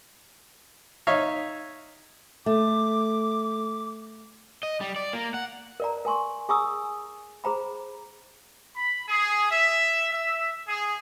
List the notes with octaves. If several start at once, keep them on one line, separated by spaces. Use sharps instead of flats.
D#4 C#5 E5 F5
A3 D6
D#5
G3
D5
A#3
F#5
A#4 D5 A#5
A#4 G#5 C6 C#6
G#4 G#5 A#5 C#6 D#6 E6
G#4 C5 A#5 B5
B5
G#4
E5
E5
G#4